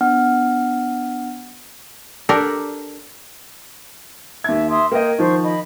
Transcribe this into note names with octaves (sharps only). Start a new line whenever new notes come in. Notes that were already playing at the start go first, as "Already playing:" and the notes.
B3 D4 F#5 F6
D4 G4 A4 A#4 D5
D#2 E5 G#6
E5 C6 D#6
A#3 A#4 D#5 G5
D#3 F3 C5 C#6
D#5 B5